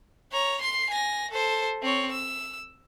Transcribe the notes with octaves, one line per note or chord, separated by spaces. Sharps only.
C#5 A#5
C6 C7
G#5 A#6
A4 C5
C4 C#5
E6